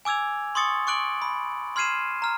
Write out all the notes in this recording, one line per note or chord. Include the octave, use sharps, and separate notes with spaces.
G#5 D6 E6 G#6 F7
C6 C#6 D#6 A6 C#7
C#6 D6 F#6 D7 F#7
B5
C6 F6 G#6 C7 D#7 E7
A#5 F6